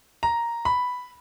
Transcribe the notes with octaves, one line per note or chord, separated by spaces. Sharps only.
A#5
B5